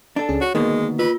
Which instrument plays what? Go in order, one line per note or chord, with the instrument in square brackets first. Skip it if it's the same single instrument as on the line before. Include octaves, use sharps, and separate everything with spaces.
[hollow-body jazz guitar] D4 A4
[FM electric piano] C#2 C#4 G#4
[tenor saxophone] F#4 [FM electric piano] C#5
[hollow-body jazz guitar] D2 B2 D#3 [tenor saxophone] G#3 [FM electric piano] A#3
[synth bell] F4 [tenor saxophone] B4